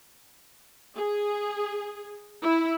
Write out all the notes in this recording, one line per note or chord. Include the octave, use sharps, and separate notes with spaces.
G#4
E4